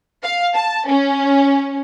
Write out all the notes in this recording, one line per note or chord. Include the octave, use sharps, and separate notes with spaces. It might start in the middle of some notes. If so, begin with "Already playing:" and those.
F5
A5
C#4